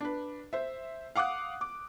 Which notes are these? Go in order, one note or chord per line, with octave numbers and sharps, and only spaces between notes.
D4 B4
C5 E5
F5 F#5 D6 D#6 F#6
D6